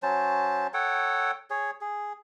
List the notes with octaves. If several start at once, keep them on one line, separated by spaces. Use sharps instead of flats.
F#3 C#4 C5 A5
A4 C#5 F#5 G5
G#4 C#5
G#4